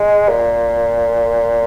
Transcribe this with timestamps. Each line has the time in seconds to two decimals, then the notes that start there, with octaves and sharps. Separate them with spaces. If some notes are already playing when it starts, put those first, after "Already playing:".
Already playing: G#3
0.28 A#2